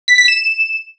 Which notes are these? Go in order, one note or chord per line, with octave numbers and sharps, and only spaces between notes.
B6
B6
E7